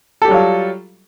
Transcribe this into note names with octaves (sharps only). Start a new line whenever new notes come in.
F#3 G3 F4 G4 A4